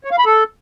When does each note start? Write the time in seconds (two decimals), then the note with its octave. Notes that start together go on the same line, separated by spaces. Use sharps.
0.04 C#5
0.11 F5
0.19 B5
0.26 A4